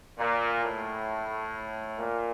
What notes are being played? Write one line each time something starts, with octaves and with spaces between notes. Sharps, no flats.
A#2
A2
A#2